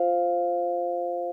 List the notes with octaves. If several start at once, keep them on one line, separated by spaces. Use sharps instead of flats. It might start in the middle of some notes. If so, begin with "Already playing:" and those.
Already playing: F4 C5 F5